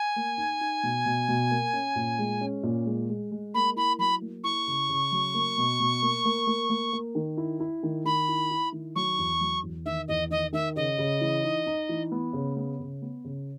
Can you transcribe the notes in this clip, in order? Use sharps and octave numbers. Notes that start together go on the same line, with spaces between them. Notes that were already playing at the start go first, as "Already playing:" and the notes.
Already playing: G#5
A#3
D#4
D#4
B2
B2
B2
A#3
C#4
A#2
G#3
C#4
A#2
G#3
G#3
G#3
A#3 B5
E4 B5
F#3 B5
A#3
E4 C#6
C#3
C#3
F#3
A#3
B2
B2
A#3
A#3
A#3
A#3
A#3
D#3
E4
E4
D#3
D#3 B5
E4
E4
D#3
F#3 C#6
E2
F#3
E2
D#3 E5
E2 D#5
D#3 D#5
D#3 E5
C#3 D#5
C#3
E3
D#4
D#4
E3
B3
C#3
B3
C#3
B3
C#3